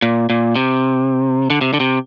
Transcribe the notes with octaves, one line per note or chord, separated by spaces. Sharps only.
A#2
A#2
C3
D3
C3
D3
C3